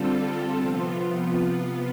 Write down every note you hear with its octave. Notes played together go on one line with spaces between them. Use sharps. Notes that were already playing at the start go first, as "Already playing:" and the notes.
Already playing: D3 G3 C4 F4 A4
C3 F3 B3 F4